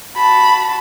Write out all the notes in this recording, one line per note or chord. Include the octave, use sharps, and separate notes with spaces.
F#4 A5 B5